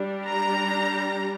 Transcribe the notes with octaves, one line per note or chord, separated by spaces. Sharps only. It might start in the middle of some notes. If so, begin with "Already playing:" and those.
Already playing: G3 D4
A#5